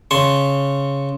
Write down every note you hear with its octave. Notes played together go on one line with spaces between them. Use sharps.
C#3 A5 C6 C#6